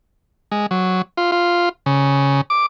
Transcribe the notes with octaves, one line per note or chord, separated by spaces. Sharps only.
G#3
F#3
F4
F4
C#3
D6